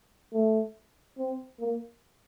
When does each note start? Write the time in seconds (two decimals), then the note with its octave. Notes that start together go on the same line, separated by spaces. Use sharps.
0.34 A3
1.18 C4
1.60 A#3